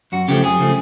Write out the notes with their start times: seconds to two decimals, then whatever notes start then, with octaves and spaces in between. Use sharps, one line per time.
0.12 F#2 F#4
0.28 C#3 F3 A3 G4
0.43 F#2 G#4
0.59 C#3 F3 A3